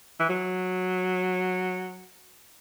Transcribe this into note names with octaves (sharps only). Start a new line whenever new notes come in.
E3
F#3